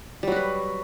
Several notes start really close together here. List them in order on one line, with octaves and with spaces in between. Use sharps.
G3 F#3 F#4 B4